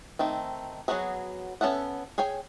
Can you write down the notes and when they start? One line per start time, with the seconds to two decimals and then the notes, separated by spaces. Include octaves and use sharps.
0.19 D#3 A3 C4
0.88 F#3 A#3 B3 F#4 G#4
1.61 B3 C#4 A4 E5 F#5
2.18 G#4 C#5 G5 G#5